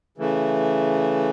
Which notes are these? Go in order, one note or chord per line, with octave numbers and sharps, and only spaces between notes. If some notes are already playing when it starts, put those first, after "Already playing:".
C#3 E3 A3